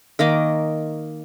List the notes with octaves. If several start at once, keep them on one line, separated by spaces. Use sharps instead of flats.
D#3 A#3 D#5 D6